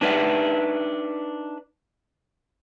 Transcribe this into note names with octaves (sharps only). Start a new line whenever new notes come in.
D4 D#4 B4 C5 D5 E5